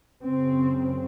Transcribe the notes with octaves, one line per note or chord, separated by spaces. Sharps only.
F#2 C#3 C4